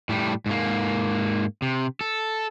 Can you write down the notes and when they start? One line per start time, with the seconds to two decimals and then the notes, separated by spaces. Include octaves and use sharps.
0.09 A2 G3
0.46 G#2 A#3
1.62 C3
2.01 A4